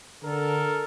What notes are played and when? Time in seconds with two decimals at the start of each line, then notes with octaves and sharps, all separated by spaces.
0.23 D3 A4 A#4